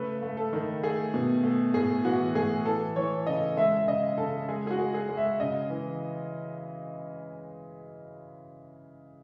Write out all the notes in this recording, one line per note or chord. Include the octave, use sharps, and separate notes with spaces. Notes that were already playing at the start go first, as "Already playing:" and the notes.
Already playing: C#3 A3 B4
A3
A4
D#3
A3 G#4
B2
A3
A2 G#4
E3 F#4
A2 G#4
E3 A4
E3 C#5
C#3 D#5
G#3 E5
E5
C#3 D#5
C#3 A4
G#3 G#4
G#4
F#4
G#3
G#4
G#3
E5
C#3 D#5
E3